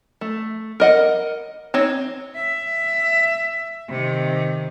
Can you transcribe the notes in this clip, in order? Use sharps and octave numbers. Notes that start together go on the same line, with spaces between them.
A3
A#4 D#5 F#5
C4 D#4 C#5
E5
C3 D#3